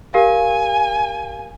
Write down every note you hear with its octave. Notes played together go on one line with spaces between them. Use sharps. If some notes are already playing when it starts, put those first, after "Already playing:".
G4 A#4 F5 G#5